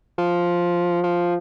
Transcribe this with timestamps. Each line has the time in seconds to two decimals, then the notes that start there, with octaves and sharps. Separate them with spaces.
0.18 F3
1.04 F3